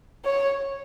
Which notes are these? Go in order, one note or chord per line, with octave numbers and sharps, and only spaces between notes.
C#5